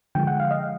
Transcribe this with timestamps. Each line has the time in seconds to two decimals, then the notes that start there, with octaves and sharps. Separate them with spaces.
0.15 D3 F3 G#3 G5
0.27 F#5
0.40 F5
0.51 D#5